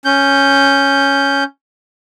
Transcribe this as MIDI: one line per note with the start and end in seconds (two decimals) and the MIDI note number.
0.05 1.44 61
0.05 1.44 91